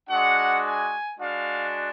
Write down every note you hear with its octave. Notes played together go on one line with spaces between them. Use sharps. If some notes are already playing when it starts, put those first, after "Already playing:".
G#3 D4 F#4 F#5
G#5
G#3 D4 F#4 F5